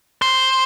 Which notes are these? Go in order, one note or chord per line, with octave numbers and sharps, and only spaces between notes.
C5